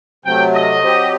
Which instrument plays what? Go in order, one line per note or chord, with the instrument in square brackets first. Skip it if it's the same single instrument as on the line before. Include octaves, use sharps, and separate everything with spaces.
[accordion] C3 F#3 A3 [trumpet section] G5
[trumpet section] D#5
[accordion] F#3 C4 G4